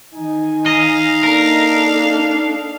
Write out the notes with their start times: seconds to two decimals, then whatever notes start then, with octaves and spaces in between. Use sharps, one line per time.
0.14 D#3 D#4 G#5
0.66 D#5 F5
1.23 A#3 D4 A4 A#4